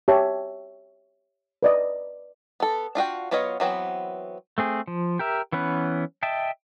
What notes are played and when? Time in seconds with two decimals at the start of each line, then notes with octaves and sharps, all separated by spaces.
0.08 G4 C#5 E5 A5
1.63 B4 D5 D#5
2.60 B3 A4
2.95 D4 F4 F#4 G5
3.31 F#3 B3 F4 C#5 D#5
3.60 E3 F#3 B3 C4
4.58 A3 C4 G#4
4.87 F3
5.19 G4 A#4 E5
5.52 E3 B3 C#4 B4
6.23 D#5 E5 G5 A5